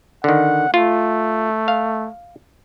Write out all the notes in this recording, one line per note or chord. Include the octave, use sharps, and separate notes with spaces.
D3 D#3 F#5
A3 F4
F5